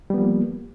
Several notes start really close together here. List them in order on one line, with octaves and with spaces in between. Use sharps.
G3 B3 F3 A#3